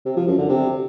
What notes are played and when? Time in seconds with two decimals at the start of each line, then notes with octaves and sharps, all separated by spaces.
0.06 C3
0.16 F3
0.27 F#2
0.38 D3
0.49 C3